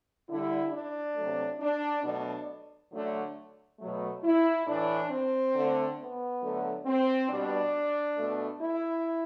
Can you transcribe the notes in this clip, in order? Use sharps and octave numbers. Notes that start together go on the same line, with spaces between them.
D3 G3 E4
D4
C3 F#3 A3
D4
B2 F#3 A3 D4
D3 F#3 A3
B2 F#3 A3
E4
A2 E3 A3 D4
C4
D3 A3
B3
D3 F#3 A3
C4
B2 G3 D4
B2 A3
E4